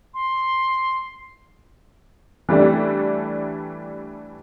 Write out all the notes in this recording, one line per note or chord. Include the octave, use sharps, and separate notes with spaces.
C6
E3 G3 A3 D4